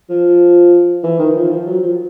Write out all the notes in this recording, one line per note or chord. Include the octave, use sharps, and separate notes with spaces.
F3
E3
D#3
F3
F3
F#3
F3